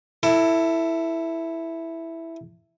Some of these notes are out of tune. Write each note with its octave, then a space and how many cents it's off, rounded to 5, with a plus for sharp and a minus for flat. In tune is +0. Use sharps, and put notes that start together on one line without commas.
E4 +0 A4 +20